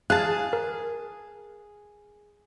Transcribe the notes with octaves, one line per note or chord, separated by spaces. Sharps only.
G#4 F5 A5 F#6
A#4